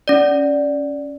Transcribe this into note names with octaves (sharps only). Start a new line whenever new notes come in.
C#4 D5